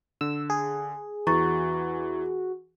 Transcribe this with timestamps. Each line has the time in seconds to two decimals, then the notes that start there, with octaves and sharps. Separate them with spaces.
0.21 D3 E6
0.50 G#4
1.27 E2 E3 F#4 A#5 C#6 A6